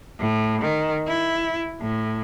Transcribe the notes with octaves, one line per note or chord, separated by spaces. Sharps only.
A2
D#3
E4
A2